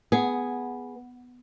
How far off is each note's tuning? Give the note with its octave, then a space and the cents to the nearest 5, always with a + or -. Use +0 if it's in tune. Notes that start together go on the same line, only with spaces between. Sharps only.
B3 +0 G#4 +0